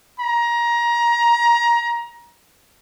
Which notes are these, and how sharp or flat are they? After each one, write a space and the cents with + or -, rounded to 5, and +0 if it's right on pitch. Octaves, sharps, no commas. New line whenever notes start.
A#5 +25